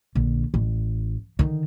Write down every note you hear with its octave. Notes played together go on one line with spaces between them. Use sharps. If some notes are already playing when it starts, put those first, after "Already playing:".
A#1 D3
A1
D3 D#3